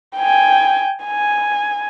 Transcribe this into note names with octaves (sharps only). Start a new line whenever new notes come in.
G5 G#5
G#5